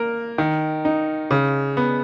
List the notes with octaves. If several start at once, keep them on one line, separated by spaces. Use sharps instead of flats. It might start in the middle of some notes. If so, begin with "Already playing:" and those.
Already playing: A#3 A#4
D#3
D#4
C#3
B3